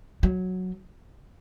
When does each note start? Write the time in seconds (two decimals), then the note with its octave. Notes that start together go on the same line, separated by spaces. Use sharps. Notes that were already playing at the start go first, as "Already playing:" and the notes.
0.23 F#3